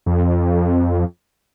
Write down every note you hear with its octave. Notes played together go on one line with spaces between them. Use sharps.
F2